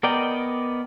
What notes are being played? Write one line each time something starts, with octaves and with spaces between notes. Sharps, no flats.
B3 A#4 D5 D#5 G5